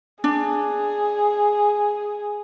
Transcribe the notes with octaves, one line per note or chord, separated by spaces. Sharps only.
D4 G#4